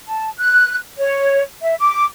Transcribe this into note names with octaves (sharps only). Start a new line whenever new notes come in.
A5
F#6
C#5
E5
D6